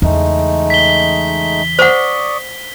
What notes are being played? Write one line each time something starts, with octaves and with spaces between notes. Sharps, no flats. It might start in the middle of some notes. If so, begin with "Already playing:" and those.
E2 C#3 G#3 A3 D#4
B6 G7
C5 D5 F#5 C#6 D#6